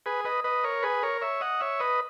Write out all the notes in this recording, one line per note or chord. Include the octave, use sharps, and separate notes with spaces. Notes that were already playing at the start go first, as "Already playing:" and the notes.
G#4 B4
B4 D#5
B4 D#5
A#4 C#5
G#4 B4
A#4 C#5
C#5 E5
D#5 F#5
C#5 E5
B4 D#5